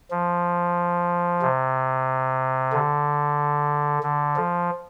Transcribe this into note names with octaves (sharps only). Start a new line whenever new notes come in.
F3
C3
D3
D3
F3